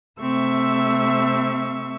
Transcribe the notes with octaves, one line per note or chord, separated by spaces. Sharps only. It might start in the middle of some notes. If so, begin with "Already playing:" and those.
C3 A3 C4 E5 C#6 E6